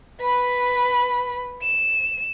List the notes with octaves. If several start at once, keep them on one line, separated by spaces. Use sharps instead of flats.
B4 B5
E7